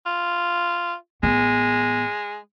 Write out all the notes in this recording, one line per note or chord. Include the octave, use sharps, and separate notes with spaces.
F4
A1 G#3 B3